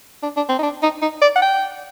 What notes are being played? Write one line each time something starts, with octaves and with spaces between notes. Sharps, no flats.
D4
D4
C4
D#4
D4
D#4
D#4
D5
F#5
G5